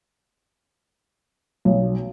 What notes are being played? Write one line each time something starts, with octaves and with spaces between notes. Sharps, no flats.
B1